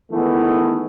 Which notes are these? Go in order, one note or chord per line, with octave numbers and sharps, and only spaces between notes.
D#3 E3 G#3 A3 B3